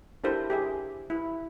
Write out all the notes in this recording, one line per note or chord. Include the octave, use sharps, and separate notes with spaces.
D4 E4 G4 A4 A#4 C5
G4 G#4 E5
E4